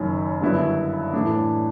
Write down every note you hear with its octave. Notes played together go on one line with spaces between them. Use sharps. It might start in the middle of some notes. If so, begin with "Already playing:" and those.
Already playing: F#1 F#2 D#3
G2 D3 F#3 B3 E4
A2 E3 A3 D4